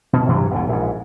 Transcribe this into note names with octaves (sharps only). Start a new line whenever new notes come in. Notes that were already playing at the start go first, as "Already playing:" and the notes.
B2
G2 C3 E3 F#3
A1 E2 G#2 B2
A#1 G#2